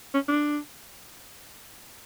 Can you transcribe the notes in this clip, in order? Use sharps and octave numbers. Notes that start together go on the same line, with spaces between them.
C#4
D4